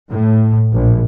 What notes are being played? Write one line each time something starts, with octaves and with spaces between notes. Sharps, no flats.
A2
A#1